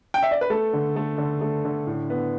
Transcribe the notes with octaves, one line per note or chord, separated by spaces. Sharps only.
G5
E5
D5
B4
A3 A4
D3
A3
D3
A3
D3
A2
B3